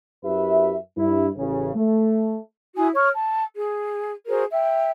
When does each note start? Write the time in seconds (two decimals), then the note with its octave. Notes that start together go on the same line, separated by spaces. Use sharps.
0.24 F#2 E4 G4 B4 E5
0.96 G2 E4
1.36 A1 C#3
1.74 A3
2.77 E4 F#4 G#5 D#6
2.95 C#5 C#6 F6
3.14 A5
3.56 G#4
4.28 F#4 G#4 A#4 C5
4.51 E5 G5